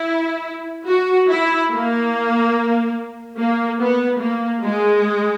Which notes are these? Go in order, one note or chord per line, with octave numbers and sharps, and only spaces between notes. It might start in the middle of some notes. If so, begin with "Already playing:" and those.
Already playing: E4
F#4
E4
A#3
A#3
B3
A#3
G#3